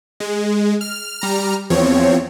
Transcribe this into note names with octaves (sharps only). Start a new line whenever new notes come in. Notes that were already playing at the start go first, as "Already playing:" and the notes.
G#3
F6
G3 A#5 F6
E2 F3 C4 C#5